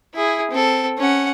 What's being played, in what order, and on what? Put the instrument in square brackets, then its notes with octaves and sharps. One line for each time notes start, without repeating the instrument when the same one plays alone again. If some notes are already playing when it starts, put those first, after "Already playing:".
[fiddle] E4 G#4
C4 A4
C#4 F#5